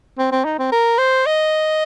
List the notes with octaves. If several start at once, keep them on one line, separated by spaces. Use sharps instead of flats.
C4
C4
D#4
C4
A#4
C5
D#5